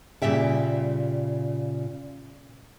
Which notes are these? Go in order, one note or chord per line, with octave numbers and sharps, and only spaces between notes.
A#2 C#3 G3 E5 G5